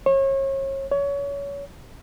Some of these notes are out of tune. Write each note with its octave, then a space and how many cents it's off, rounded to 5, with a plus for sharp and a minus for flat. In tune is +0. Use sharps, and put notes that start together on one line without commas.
C#5 -35
C#5 +25